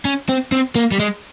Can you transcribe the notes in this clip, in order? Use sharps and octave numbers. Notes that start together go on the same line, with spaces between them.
C#4
C4
C4
A#3
G3
G#3